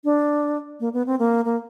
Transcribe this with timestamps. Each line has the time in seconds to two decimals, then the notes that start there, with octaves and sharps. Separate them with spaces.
0.04 D4
0.80 A#3
0.94 B3
1.07 C4
1.19 A#3
1.45 A#3